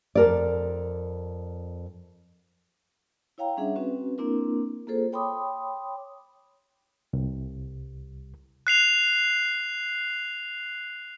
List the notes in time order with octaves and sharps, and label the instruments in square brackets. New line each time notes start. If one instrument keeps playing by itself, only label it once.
[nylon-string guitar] F2 A#4 D5
[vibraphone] E4 C#5 F5 G5 A#5
G3 C#4 D4 G#4 E5 F#5
C4 C#4 F#4 B4
A#3 C4 D4 E4 A#4
A#3 F4 G#4 A4 C5
C#5 G5 B5 C6 D6 D#6
[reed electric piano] C2
[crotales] F#6 C7 F7